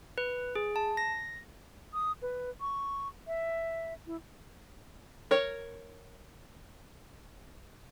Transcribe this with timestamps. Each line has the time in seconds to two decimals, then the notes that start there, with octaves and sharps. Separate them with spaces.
0.18 B4
0.55 G#4
0.76 A5
0.97 A#6
1.93 D#6
2.22 B4
2.61 C#6
3.27 E5
4.07 E4
5.31 A#4 C#5